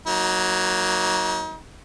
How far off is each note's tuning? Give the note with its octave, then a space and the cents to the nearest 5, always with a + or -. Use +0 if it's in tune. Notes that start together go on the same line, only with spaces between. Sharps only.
F#3 +0 A#3 +0 D#4 +35